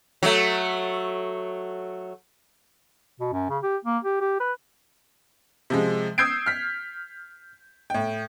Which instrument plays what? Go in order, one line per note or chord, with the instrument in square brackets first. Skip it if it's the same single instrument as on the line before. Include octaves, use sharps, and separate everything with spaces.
[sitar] F#3 A3
[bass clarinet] B2
F#2
C#3
G4
A#3
G4
G4
B4
[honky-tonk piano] C3 F3 G#3
D#6 E6 G6 G#6 C7 D7
F6 B6
A2 G5